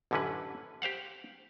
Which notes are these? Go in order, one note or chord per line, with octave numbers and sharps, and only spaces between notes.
A1 F#2 D3 E3 C#4 B4
G4 C5 F5 F#5